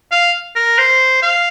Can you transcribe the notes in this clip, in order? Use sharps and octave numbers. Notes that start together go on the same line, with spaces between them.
F5
A#4
C5
F5